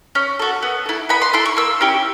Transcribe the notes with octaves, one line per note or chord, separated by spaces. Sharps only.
C#4
F#4 A4
B3
E4 A4
B3 B5
C6
E4 A4 C6
C#6
A#3 E6
C#4 E4 G4